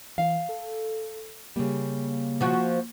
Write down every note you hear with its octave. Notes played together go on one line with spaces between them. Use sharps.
E3 F5
A4
C#3 G3 A#3
F3 F#4